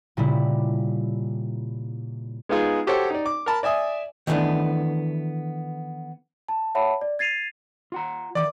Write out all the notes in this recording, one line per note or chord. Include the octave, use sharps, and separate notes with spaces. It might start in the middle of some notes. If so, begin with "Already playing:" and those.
A#2 C#3 G3 E4
G#3 B3 D#4 F4 G#4
F#4 G4 A4 C5 C#5 G5
D#4 D5
D6
A#4 A5 B5
D5 E5 G#5 D#6
D#3 E3 G3 A3 B3 D4
A5
C#5 E5 F#5 A5 B5
D5
G#6 A6 C7 D#7 F7
F4 F#5 A#5
D#3 E3 D5 D6